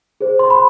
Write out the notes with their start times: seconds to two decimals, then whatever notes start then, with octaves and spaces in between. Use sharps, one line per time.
0.21 G#4 C5
0.39 C6
0.50 B5